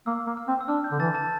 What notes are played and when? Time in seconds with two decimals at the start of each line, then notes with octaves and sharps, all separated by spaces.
0.06 A#3 E6
0.27 A#3
0.37 F6
0.48 C4
0.61 E6
0.68 D4 F6
0.84 G6
0.92 D3
0.99 E3 A5 A6
1.15 A5 A6